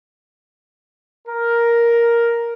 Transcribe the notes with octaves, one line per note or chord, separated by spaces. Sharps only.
A#4